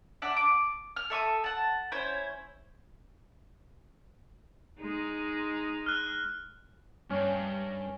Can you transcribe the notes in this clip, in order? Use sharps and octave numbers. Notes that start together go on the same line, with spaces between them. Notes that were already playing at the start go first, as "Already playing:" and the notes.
D4 E5 F#5
D6
F6
A4 E5 C#6 D#6
F#5 A5
C#4 E4 C5 C#5
G#3 D#4
F6 F#6
G2 C#4